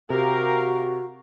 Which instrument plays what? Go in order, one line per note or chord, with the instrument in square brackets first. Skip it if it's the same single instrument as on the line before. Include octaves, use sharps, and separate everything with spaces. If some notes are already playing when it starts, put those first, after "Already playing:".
[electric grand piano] C3 [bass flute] F#4 [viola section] G4 A#4 F5